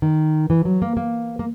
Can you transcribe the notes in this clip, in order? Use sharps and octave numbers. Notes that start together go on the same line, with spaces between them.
D#3
E3
F#3
A#3
A#3
A#3